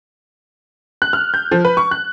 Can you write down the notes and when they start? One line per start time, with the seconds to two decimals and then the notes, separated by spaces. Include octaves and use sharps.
1.02 F#6
1.13 F6
1.34 G6
1.52 F3
1.65 B4
1.77 C#6
1.91 F#6